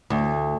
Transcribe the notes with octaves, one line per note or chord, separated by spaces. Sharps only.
D2